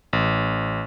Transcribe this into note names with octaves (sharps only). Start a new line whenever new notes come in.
A1